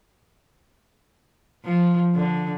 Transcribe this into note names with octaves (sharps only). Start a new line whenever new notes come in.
F3
D3